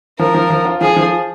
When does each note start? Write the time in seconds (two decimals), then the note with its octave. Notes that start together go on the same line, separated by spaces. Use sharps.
0.19 F3 A#4
0.34 F3
0.50 F3
0.65 F4
0.81 F3 G#4
0.97 F3